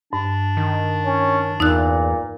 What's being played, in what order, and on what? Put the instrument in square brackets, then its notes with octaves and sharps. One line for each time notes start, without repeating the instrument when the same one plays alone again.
[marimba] G2 [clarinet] D4
[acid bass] D#3
[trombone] C#4
[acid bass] E2 [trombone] A#2 [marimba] D#4 E6 F#6